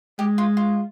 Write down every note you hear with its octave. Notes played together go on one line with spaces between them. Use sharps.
G#3 G4
F4
F4